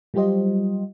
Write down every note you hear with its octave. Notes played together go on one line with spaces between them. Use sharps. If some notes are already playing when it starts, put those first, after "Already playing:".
F#3 G3 F4 G4 C5 D#5